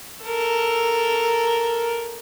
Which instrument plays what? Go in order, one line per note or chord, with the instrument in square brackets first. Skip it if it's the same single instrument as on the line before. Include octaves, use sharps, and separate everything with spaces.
[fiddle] A4 A#4